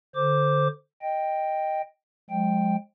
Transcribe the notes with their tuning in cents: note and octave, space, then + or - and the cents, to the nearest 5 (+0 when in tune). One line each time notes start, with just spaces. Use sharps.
D3 +0 C5 +0 D6 +0
D#5 +0 G5 +0
F3 +45 G#3 +0 G5 +0